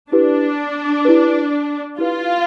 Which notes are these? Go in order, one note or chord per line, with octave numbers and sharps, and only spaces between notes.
D4 E4 G4 B4
E4 G4 B4
E4 F4 G4 B4